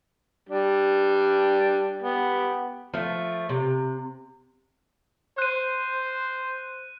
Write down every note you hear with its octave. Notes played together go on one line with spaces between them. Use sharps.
G3 D4
B3 G4
F3 A3
C3
C5 F#6 D#7